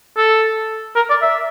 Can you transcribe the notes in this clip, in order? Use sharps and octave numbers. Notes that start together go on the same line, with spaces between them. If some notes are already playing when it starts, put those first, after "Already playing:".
A4
A#4
D5
E5